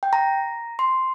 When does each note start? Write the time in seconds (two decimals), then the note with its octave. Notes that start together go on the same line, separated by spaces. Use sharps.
0.03 G5
0.13 A#5
0.79 C6